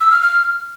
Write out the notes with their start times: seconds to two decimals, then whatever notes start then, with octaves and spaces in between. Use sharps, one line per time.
0.01 E6
0.11 F6
0.22 F6